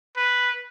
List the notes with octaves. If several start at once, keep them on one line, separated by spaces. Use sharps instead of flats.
B4